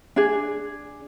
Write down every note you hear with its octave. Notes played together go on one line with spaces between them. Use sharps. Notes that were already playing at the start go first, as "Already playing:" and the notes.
D4 G#4